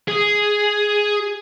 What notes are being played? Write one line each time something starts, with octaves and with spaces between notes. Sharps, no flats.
G#4